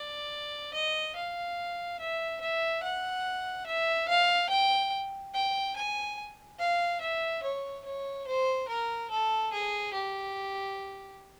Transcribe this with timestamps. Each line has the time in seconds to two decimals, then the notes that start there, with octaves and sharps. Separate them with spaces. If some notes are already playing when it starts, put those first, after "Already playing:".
Already playing: D5
0.74 D#5
1.16 F5
2.00 E5
2.41 E5
2.83 F#5
3.67 E5
4.08 F5
4.50 G5
5.34 G5
5.76 G#5
6.59 F5
7.01 E5
7.43 C#5
7.85 C#5
8.27 C5
8.69 A#4
9.11 A4
9.52 G#4
9.94 G4